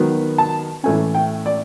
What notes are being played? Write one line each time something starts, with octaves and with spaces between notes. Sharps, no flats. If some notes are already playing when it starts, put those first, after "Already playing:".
Already playing: D#3 F#3 B3
A5
A2 E3 A3 C#4 G#5
G5
D5